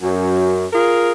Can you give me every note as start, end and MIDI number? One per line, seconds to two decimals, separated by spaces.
0.02 0.66 42
0.73 1.12 65
0.73 1.12 68
0.73 1.12 70